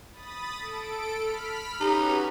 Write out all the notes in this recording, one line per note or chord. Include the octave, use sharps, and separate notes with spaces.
B5 D#6 A6
A4 D7
B5 F6 B6
C#4 D#4 F#4 G4 B4